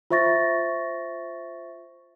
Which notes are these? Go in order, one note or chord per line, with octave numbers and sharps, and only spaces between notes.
F4 C5 E5 C#6 A6 A#6